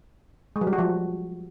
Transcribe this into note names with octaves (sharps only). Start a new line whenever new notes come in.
G#3
F#3
G3
F#4
F3